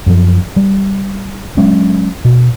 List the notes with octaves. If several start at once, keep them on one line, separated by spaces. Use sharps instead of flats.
F#2 F3
G3
F#3 G#3 C#4 D4
B2